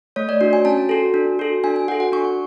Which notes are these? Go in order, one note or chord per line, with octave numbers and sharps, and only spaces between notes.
A3 C#5
D5
D4 F#4
G#5
C#4 A5
F#4 A4
D4
F#4 A4
D4 G#5
G#5
F#4 A4 F#5
F#5
D4 C#6